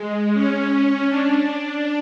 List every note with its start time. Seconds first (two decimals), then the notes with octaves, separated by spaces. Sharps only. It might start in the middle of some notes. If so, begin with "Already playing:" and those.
Already playing: G#3
0.34 C#4
1.08 D4